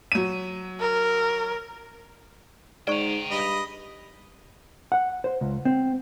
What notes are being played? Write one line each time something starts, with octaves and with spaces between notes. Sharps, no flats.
F#3 D#7
A#4
G#2 D5 G5 A#5 C#6
G2 D#5 B5
F#5
C5
C#2
C4